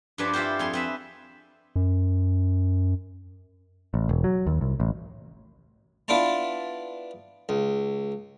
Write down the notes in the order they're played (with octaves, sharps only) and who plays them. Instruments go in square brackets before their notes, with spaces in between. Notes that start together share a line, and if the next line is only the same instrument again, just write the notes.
[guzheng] G2 F3 D4 B4 D5 G#5
E4 F4 G4 C5
F2 G#4 G#5 C6
C4 B4 E5
[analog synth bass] F#2
[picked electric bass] A1
E1
F#3
D#2
C2
A1
[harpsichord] B3 D4 E4 F4 A5
C#2